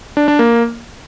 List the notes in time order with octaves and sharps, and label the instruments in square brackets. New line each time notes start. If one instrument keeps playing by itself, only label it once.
[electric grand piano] D4
D4
A#3